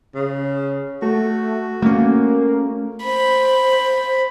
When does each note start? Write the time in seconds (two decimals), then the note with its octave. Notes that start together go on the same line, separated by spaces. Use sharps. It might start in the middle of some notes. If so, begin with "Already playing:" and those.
0.15 C#3
1.02 A3 F#4
1.82 A3 A#3 C#4
3.04 C5 B5